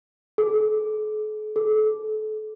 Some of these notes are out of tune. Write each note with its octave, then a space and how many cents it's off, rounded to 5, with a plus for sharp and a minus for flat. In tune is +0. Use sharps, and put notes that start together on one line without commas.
A4 -45
A4 -30